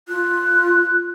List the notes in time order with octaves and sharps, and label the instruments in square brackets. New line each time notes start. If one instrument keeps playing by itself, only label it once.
[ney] F4 [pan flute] F#6